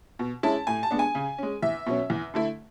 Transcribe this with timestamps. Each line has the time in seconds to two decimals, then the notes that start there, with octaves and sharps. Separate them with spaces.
0.19 B2
0.43 G#3 C#4 E4 A5
0.67 A2 G#5
0.83 A5
0.91 G#3 B3 D4
0.99 G#5
1.15 C#3
1.38 G#3 C#4
1.62 E2 E5
1.86 B2 F#3 C#4
2.10 E2
2.34 D3 A3 E4